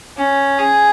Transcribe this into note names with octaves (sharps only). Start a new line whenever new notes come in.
C#4
G#4